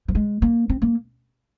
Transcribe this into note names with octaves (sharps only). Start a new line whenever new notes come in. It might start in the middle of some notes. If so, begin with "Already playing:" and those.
F3
G#3
A#3
C4
A#3